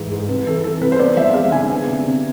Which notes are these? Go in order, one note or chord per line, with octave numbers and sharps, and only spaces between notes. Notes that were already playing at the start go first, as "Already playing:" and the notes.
Already playing: G#2 E3 G#3
G#2
C3 B4
E3 A4
E3 A4
C3 B4
C5
B3 D5
F3 E5
G#3 F5
D3 G#5
B3
C3
C3